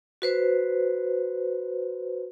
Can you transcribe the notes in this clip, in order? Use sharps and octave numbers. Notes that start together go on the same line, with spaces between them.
F#4 B4 C5